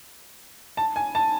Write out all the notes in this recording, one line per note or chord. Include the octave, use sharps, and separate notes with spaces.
A5
G#5
A5